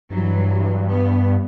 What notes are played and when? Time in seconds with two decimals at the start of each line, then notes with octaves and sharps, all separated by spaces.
0.10 G2 E3 F#3
0.88 B3